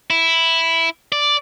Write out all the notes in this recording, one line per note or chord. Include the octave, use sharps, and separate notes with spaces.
E4
D5